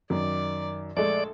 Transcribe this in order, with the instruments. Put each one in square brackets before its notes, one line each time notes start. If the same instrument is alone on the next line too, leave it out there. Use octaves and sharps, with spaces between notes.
[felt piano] F#2 D#3 [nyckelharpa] D5
[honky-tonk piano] A#1 G#3 A3 [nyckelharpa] A4 [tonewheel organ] D5